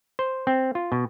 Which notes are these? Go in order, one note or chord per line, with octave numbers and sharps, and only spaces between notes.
C5
C4
F4
B2